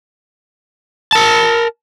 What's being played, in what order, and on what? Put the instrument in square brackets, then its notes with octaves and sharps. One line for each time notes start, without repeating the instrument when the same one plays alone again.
[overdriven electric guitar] A#4 A5